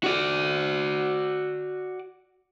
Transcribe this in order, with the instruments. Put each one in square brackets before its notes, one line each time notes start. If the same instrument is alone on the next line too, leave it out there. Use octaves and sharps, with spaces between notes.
[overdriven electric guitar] F#4 D5